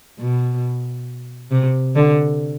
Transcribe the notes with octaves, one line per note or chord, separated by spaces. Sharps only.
B2
C3
D3